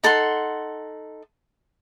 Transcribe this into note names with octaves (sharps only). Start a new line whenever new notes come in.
D#4 A4 F#5 C6